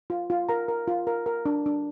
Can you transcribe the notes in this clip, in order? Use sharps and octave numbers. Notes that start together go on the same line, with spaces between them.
F4
F4
A#4 A#5
A#4
F4
A#4
A#4
D4
D4